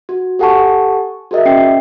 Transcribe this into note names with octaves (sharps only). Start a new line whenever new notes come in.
F#4
G4 A4 F#5 G#5 A5 C#6
F#4 G#4 A#4 D#5 E5
C#4 G5 C7 C#7